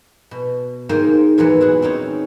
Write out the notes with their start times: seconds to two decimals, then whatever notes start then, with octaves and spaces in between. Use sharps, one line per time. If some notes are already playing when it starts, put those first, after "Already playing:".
0.31 B2
0.89 G#2 D#3 A#3 C5 D#5 G5
1.38 E2 A#2 E3 F#3 B3
1.61 E4 G#4 F#5
1.82 C4 C#4 D#4 C#5